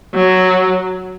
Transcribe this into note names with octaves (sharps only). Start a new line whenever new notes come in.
F#3